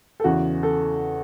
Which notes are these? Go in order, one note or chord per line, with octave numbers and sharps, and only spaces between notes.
A4
E2 C#3 E3 F#4
A4